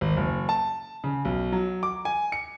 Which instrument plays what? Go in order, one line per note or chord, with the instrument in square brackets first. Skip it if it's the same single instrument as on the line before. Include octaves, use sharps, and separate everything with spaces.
[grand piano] G#1
F#1
A5
C#3
B1
F#3
D6
G#5
C#7